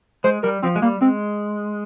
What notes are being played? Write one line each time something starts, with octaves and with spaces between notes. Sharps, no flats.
G#3 C5
G3 A#4
F3 C4
G#3
G3 A#3
G#3 C4